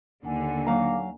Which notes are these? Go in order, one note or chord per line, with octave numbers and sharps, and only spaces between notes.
D#2 D3 D#4 F#5 G#5
F#3 A#3 F5 A#5